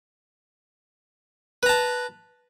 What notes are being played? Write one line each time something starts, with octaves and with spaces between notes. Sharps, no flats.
B4 A5 A#5